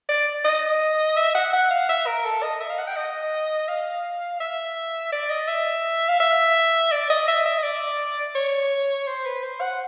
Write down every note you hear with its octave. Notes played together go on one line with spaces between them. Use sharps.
D5
D#5
E5
F#5
F#5
F5
E5
A#4
A4
D#5
E5
F5
F#5
G5
D#5
F5
E5
D5
D#5
E5
F5
E5
D5
D#5
E5
E5
D#5
D5
C#5
C5
B4
C5
F#5